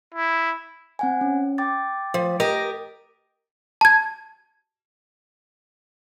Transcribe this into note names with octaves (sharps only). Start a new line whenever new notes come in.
E4
C4 F#5 G#5
C#4
G5 D6 A6
F3
G4 A#4 D#5
A5 G#6